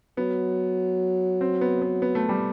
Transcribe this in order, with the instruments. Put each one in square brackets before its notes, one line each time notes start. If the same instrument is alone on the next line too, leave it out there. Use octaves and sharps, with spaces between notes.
[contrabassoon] F#3 [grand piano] B3
[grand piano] C4
B3
B3
B3
A3
G3